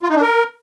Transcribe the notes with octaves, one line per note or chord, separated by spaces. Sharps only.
F4
D#4
D4
A#4